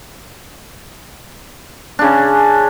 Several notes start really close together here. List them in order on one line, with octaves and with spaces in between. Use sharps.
D4 C#3 C#4